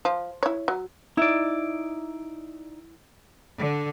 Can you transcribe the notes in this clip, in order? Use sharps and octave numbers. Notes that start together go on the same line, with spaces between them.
F3
E4 C#5
F#3
D#4 E4 D5
D3